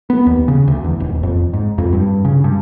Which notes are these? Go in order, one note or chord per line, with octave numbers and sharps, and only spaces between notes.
B3
D#2
C#3
D2
E2
D#1
F2
G#2
F2
G2
C#3
G2